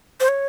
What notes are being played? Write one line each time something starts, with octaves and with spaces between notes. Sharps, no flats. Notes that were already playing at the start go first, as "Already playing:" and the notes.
C5
C#5